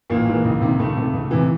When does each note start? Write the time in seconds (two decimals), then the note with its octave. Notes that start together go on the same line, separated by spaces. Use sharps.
0.10 A1 A#2 A#3
0.27 G#2 E3
0.45 C#2
0.61 C3 D#3
0.79 C#2 A3
0.97 C3 D#3
1.14 C#2
1.31 C3 E3